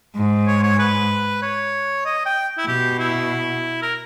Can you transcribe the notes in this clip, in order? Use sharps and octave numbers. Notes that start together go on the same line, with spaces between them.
G#2
C#5
C#5
B4
C#5
D#5
G5
E4
B2 G4
E4
A#4